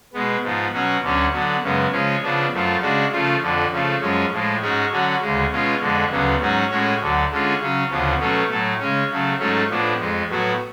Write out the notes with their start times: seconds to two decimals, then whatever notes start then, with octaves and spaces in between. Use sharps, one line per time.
0.13 B2 G#3 B3
0.43 G#2 F3 B3
0.73 B2 F#3 C#4 F#4
1.02 D2 D3 F#3 C#4
1.32 D3 F#3 B3
1.63 F#2 C#3 G#3 B3
1.92 C#3 F3 G#3 C#4
2.23 C#3 F3 B3 D4
2.52 F#2 F3 A3 F4
2.81 C#3 G#3 D4 F#4
3.12 C#3 F3 A3 F4
3.42 F2 D3 F3
3.71 C#3 F3 A3
4.01 F#2 F3 G#3 C#4
4.32 A2 F3 G#3
4.61 G#2 G#3 C#4 F#4
4.91 D3 F#3 C#4 F#4
5.21 D2 C#3 G#3
5.51 B2 G#3 C#4 F4
5.80 F2 D3 G#3
6.10 D2 C#3 F#3 B3
6.40 G#2 F#3 C#4 F#4
6.70 A2 G#3 C#4 F#4
7.00 D2 D3 F#3
7.30 D3 G#3 C#4 F4
7.60 C#3 F#3 C#4
7.90 D2 C#3 F3 B3
8.19 B2 F#3 A3 C#4
8.49 A2 F#3 A3
8.80 C#3 G#3 C#4
9.09 C#3 F#3 A3
9.39 G#2 F#3 A3 C#4
9.69 A2 F3 B3 D4
10.00 F2 F3 G#3
10.29 A2 F#3 B3 F#4